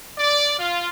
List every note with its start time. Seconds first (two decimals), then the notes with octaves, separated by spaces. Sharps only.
0.18 D5
0.59 F4